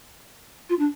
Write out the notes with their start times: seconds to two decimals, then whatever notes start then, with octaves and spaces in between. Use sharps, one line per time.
0.69 F4
0.78 D4